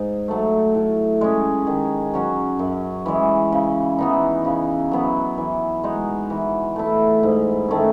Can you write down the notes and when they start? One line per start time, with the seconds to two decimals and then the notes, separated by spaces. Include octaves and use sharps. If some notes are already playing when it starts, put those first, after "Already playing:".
Already playing: G#2
0.28 F#3 A3
0.75 A2
1.21 G#3 C#4
1.67 D#3
2.14 F#3 C#4 F#4
2.59 F#2
3.06 E3 G#3
3.52 C#3
3.99 E3 B3 D#4
4.45 C#3
4.92 F#3 B3 E4
5.38 E3
5.84 G#3 D#4 F#4
6.30 E3
6.76 A3 E4
7.23 G#2
7.68 D#3 A3 C#4